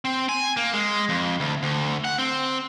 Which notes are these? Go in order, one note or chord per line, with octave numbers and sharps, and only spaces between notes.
C4
G#5
A#3
G#3
F2
D2
D2
F#5
C4